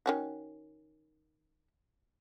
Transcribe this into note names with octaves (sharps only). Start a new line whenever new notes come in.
D#3 C#4 F#4